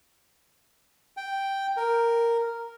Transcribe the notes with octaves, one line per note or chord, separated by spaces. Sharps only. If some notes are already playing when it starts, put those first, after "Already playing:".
G5
A#4